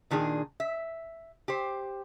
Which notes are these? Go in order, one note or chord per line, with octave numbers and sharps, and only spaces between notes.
A#2 D#3 D4 G#4
E5
G4 C5